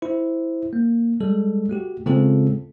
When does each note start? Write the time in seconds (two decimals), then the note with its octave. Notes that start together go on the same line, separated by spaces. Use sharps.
0.02 E4 C5
0.73 A#3
1.21 G3 G#3 A4
1.69 A3 F#4 G4
2.06 C#3 G#3 A3 C4 F4 A4